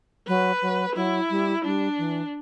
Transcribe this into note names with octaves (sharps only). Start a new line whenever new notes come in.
F#3 B4
F#3
F#3 E4
G3
G3 D4
E3